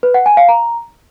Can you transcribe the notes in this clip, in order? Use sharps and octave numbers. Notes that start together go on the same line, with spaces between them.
B4
F#5
G#5
F5
A#5